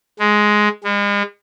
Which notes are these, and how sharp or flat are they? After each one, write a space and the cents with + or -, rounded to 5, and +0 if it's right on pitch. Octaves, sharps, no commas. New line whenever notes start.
G#3 +10
G#3 -40